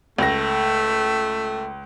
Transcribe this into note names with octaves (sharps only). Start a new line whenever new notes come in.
C#2 A3 A#6